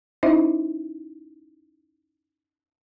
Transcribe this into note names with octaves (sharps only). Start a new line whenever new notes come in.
C#4 D#4 E4 C5 D#5 E5